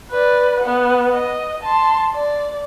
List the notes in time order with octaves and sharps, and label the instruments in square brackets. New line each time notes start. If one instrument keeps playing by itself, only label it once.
[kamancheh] B4 D5
B3 F#5
D#5
A5 C6
D5